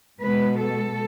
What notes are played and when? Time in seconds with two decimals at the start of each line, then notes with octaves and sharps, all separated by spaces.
0.21 B2 G#3 B4
0.59 A4